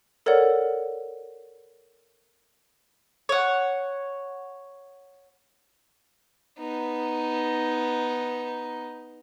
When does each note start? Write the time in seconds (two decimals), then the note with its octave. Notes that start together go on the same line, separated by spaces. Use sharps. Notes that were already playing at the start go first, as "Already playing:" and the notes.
0.26 A4 A#4 C#5 D5 F#5
3.29 C#5 F#5
6.58 B3 D#4